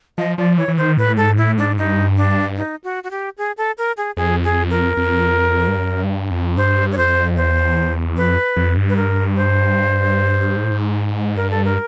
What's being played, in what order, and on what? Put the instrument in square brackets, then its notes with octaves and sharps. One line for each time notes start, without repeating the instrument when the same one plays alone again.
[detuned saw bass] F3 [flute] D#5
[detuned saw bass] F3 [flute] D5
[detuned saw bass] E3 [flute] C#5
[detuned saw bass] E3
[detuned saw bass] D#3 [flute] C5
[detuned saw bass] A2 [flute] B4
[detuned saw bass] G#2 [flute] A4
[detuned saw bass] A2 [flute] E4
[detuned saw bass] G#2 [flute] D4
[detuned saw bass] G2 [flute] D#4
[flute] D4
D#4
F#4
F#4
G4
G#4
A4
A#4
G#4
[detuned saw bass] F2 [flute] G#4
[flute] G#4
A#4
[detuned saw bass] F2
G2
F#2
G2
F2
[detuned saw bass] G2 [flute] C5
[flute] C#5
[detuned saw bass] F2 [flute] C5
[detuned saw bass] E2 [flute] C5
[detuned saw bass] F2 [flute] B4
[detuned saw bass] F2
G2
[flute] B4
A#4
C5
[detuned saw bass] G#2
A2
G#2
[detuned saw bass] G2 [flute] A#4
[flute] A4
A#4